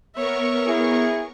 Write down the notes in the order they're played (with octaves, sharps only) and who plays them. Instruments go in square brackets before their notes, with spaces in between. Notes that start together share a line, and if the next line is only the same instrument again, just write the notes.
[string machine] B3 A#4 C#6 [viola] C#5 E5
[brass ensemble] E4 G#4